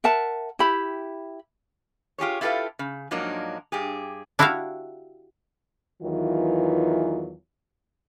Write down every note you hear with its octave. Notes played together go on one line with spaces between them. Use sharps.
A#4 E5 F#5 A5
E4 G4 B5
F4 G4 G#4 C#5
E4 F4 G4 A4 B4 F5
C#3
G#2 F3 F#3 A#3 D4 D#4
G2 G4 G#4
D4 E4 F#4 G4 E5 F5
E2 D#3 E3 F#3 F4